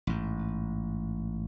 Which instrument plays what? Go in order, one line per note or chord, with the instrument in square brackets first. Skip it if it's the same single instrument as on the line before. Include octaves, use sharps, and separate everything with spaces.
[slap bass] A1 G#2